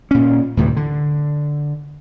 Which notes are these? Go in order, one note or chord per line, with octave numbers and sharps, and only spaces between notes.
A#2 C#4
D2 A2 C3 E3
D3